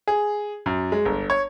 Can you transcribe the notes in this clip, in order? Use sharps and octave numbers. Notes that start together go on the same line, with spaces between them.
G#4
F#2
G#3
G1
C#5